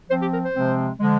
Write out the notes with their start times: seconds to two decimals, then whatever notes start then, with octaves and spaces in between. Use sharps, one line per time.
0.09 F3 C4 C5
0.21 G4
0.32 A#4
0.43 C5
0.54 C3 F3 G#3 C4
1.00 D3 F3 G#3